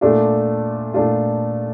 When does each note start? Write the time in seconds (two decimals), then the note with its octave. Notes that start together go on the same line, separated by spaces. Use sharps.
0.01 A#2 A3 D4 F4
0.94 A#2 A3 D4 F4